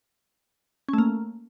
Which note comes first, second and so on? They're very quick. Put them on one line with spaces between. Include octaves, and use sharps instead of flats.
C#4 A3 A#3